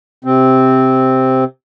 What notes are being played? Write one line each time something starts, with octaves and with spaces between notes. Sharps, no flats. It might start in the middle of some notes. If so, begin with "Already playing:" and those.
C3 C4